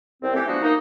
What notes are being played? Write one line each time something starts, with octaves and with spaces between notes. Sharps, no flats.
C2 C4
E3 A3 G4
E3 F3 G3 B3 D4 F#4
A#3 D#4